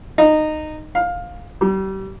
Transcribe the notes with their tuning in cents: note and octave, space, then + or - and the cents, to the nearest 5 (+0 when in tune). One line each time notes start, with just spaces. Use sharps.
D#4 -15
F5 +15
G3 -35